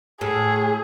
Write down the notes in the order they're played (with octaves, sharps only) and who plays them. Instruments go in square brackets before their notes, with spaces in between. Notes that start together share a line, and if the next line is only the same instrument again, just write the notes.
[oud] A2 [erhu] G#4